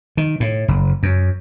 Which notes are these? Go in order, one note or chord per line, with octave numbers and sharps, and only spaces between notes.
D#3
A2
F#1
F#2